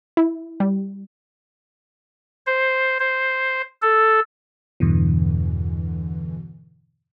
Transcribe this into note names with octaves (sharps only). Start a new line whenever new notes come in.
E4
G3
C5
C5
A4
E2 G2 B2 D3 E3